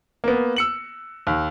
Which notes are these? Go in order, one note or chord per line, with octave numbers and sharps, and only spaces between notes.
A#3 B3
E6 C#7 F#7
D#2